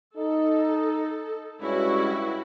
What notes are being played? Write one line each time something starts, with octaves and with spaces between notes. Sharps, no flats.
D#4 A4
G2 G#3 C#4 E4 F#4